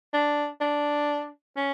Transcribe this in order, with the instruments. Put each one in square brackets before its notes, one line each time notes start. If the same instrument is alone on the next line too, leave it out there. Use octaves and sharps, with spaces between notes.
[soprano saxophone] D4
D4
C#4